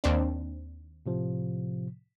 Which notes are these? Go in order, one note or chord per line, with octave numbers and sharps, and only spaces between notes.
D#2 C4 D4
A2 C3 F3